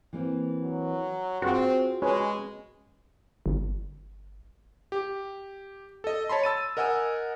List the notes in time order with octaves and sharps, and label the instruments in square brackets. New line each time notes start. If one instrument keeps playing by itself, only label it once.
[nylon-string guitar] E3 A#3 C4
[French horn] F#3
[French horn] C4 [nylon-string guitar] F4 G#4 C5 [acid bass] F#4
[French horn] G#3 [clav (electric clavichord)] C#4 B4 C#5
[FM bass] G1
[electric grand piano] G4
A4 D#5
C#5 A5 B5 C6
E6 A6 D#7
A#4 D#5 F#5 G#5 E6